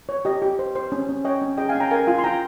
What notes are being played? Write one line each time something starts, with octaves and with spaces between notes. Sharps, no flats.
C#5
G4 D#5
G4
C5
C5
C#4
C#4
C#5 D#5 G5
C#4
G#4 D#5 G5
F5 G#5
C#4
G5 A#5
A#4 F5 G#5
F4 F5 G#5
C6
F4 G5 A#5